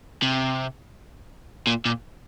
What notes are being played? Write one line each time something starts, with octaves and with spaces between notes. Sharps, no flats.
C3
A#2
A#2